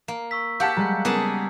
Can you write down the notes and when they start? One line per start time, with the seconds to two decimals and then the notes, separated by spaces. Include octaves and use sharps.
0.08 A#3
0.31 C#6 E6 B6
0.60 G4 F5 F#5 A5
0.77 G3 G#3 A#5 G6
1.05 C#3 A#3 B3 G#4 F#5 A5 D#6